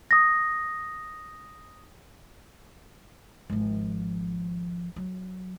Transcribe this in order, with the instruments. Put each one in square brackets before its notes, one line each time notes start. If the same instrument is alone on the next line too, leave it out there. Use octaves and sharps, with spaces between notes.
[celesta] D#6 A#6
[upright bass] G#1 F3
F#3